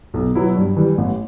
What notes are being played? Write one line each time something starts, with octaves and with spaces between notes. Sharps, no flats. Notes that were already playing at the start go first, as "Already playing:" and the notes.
B1
B2 F#3 B3 E4
G2
E3 G3
A1